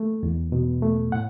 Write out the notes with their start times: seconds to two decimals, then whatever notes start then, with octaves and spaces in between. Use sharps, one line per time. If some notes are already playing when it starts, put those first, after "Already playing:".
Already playing: A3
0.23 E2
0.52 B2
0.82 A3
1.12 A2 F#5